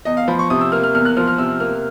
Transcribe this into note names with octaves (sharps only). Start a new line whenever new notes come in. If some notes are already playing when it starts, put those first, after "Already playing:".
E2 D#5
F5
F3 B5
C#6
C3 D#6
E6
A#3 F6
F6
E2 F6
F#6
F3 F6
F6
C3 E6
A#3 F6